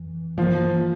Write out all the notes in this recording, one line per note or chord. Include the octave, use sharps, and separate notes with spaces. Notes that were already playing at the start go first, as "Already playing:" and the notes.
Already playing: F2 E3
G2 E3 F3 A#3